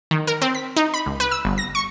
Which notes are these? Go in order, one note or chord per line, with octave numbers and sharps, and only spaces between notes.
D#3
A#4
C4
B6
D#4
B5
C#2
B4
E6
G1
A#6
C#6